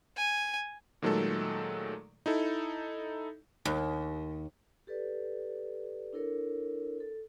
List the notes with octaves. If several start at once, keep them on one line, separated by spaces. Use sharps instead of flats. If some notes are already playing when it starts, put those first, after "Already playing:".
G#5
A#2 D#3 F#3 G#3 A3 A4
D#4 E4 A4
D#2
G4 A4 B4 D5
D4 E4 A4 A#4 C#5
A4